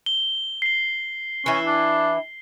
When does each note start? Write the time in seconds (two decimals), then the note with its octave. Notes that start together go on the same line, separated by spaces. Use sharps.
0.06 G7
0.62 C7 G7
1.46 E3 C#4 E4
1.66 D4